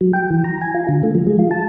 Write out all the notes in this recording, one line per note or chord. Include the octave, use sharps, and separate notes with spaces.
F#3
G5
E3
A#5
G#5
F4
D3
A3
F3
G#3
F4
A5